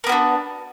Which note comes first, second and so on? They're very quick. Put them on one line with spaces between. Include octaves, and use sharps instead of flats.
A#3 B3 F#4 D4